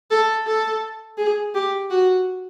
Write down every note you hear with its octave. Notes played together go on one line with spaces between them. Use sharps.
A4
A4
G#4
G4
F#4